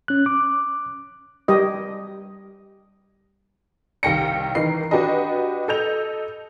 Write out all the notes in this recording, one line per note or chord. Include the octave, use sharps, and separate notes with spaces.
C#4 F#6
D6
G3 G4 D#5
C2 D#3 F5 G5 A#6 C#7
D#3 E3 D#4 A#4 C7
D4 F#4 G4 B4 D#5
A4 D#5 G6 F7